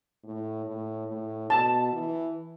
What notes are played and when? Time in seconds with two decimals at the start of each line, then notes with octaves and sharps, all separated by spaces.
0.24 A2
0.65 A2
1.08 A2
1.50 B2 A5
1.92 E3